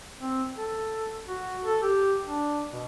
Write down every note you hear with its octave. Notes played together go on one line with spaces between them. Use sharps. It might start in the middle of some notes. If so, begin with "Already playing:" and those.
C4
A4
F#4
A4
G4
D4
B2